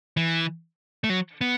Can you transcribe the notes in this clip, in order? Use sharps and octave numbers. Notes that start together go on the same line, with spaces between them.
E3
A3
F#3
B3